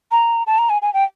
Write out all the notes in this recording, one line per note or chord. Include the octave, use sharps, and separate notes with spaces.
A#5
A5
A#5
G#5
G#5
G5